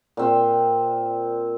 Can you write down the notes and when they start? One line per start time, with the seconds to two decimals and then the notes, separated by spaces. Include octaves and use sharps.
0.17 A#2 C4